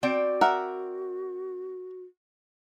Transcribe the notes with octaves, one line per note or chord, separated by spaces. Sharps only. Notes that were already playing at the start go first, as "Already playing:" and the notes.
C4 F#4 D5 G5
A#4 E5 F#5